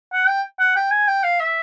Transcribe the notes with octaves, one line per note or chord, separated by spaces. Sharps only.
F#5
G5
F#5
G5
G#5
G5
F5
E5